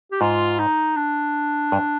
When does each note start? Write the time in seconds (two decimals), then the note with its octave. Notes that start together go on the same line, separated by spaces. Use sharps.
0.12 G4
0.21 G#2 F4
0.59 D#4
0.96 D4
1.72 G2